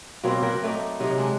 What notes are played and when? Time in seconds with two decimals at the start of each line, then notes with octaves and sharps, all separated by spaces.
0.23 B2 F#3 A#3 C4
0.42 F#3 A#4 F#5 G5
0.63 A3 D#4 D5
1.00 C3 F#3 D#4
1.18 G#3 D4